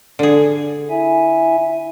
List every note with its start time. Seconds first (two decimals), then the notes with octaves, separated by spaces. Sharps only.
0.19 D3 G#4
0.90 E4 E5 G#5